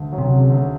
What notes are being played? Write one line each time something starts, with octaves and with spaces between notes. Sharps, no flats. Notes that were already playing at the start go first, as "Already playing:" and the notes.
Already playing: D2
F#3
C3
C#3
D2